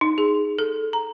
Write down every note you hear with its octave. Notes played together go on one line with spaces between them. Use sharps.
D#4
G#4
A4
A#5